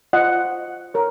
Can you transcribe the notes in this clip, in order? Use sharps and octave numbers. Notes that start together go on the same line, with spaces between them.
F4 C5 D#5 F#5
A#4 C#5